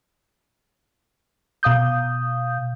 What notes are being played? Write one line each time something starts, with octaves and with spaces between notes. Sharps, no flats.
B2 F5 D#6 G6